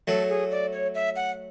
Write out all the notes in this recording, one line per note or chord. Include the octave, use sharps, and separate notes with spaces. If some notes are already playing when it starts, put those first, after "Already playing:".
F#3 A3 A4
G#4
D5
C#5
E5
F#5